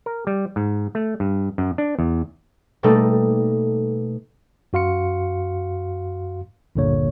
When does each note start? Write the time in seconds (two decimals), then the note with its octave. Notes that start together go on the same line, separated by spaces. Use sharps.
0.06 A#4
0.27 G3
0.56 G#2
0.95 A3
1.20 G2
1.58 F#2
1.78 D4
1.99 E2
2.83 B2 G3 A3 A#3 D#4 A4
4.73 F#2 F#4 F5 C6 C#7
6.76 G1 D#2 A#2 D3 A#3 C#5